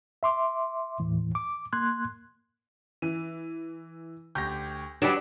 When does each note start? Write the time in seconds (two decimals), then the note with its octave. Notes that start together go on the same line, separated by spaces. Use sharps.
0.23 E5 C6 D6
1.00 D#2 A2 E3
1.35 D6
1.73 A#3 C6 F#6 G#6
3.02 E3 D#7
4.35 D2 G4 G6 A#6
5.02 F#3 G3 D4 F#4 G4 B4